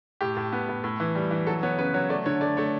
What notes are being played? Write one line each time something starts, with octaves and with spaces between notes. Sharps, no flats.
A2 G4
A2
B3
A2
A2
E3
G3
E3
F#3 A4
B3 C#5
C#3 B4
F#3 C#5
A3 D5
D3 C#5
A3 D5
A3 C#5